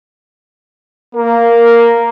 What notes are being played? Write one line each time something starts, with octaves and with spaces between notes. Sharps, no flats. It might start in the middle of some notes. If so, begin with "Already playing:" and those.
A#3 A#4